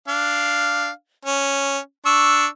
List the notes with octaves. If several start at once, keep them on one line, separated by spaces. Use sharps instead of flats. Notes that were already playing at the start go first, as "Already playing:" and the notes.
D4 F5
C#4
D4 C#6 E6